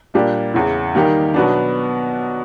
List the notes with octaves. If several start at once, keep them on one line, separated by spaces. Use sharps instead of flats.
A#2 G3 A#3 D4 G4
E2 C#3 E3
D#3 G3 A#3 D#4 G4
B2 F#3 B3 D4